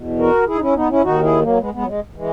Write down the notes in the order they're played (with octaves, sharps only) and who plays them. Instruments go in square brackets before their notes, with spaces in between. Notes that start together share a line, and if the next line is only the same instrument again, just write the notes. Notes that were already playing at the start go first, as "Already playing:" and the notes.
Already playing: [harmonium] E2 B2
F#4 A#4
E4 G#4
D#4
C#4 E4
B3 D#4
C#4 E4
D#2 D#3 D#4 F#4
E4 G#4
F#3 A#3
G#3 B3
G#3 B3
F#3
G#3
E3 G#3